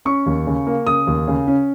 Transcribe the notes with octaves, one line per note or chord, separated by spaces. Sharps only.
C#4 C#6
D#2
C#3
A#3
C#3 D#6
D#2
C#3
C#4